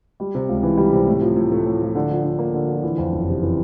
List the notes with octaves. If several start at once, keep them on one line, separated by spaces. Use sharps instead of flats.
G3
C3
C#2
E3
G3
C3
A2
F3
A2
A3
A2
F3
D3
F3
D3
A#3
D3
F3
E3
F2
F#1
C3
E3